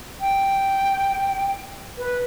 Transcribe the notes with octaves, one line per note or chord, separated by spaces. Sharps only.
G5
B4